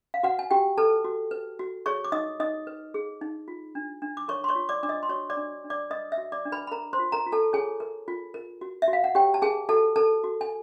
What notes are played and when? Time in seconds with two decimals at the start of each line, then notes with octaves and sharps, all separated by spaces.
0.14 F5
0.23 F#4 B4 F#5
0.39 G#5
0.51 F#4 G4 G5
0.77 A4 B4 A5
1.04 F#4
1.31 B4
1.59 F#4
1.86 G#4 C#5 C#6
2.04 D6
2.12 D#4 D#5 D#6
2.40 D#4 D#5 D#6
2.67 B4
2.94 G#4
3.21 D#4
3.48 F4
3.75 D4
4.02 D4
4.17 D6
4.28 A#4 C#5 C#6
4.44 C6
4.49 C#5 C#6
4.55 F4
4.69 D5 D6
4.83 D4 D6
4.89 D#5 D#6
5.03 C6
5.09 F#4 C#5 C#6
5.30 D5 D6
5.37 D4
5.64 D4
5.70 D5 D6
5.90 B4 D#5 D#6
6.12 E5 E6
6.18 F#4
6.32 D5 D6
6.45 D4
6.52 B4 B5
6.67 B5
6.72 A#4 A#5
6.93 C5 C6
6.99 F4
7.12 A#4 A#5
7.26 F4
7.32 A4 A5
7.53 G#4 C#5 G#5
7.80 A#4
8.08 F4
8.34 A#4
8.61 F#4
8.82 E5
8.88 F#4
8.93 F5
9.04 F#5
9.15 G4 C#5 G5
9.34 A5
9.42 G#4 A#4 G#5
9.69 F#4 A4 A5
9.96 A4 A#4 A5
10.24 F#4
10.41 G#5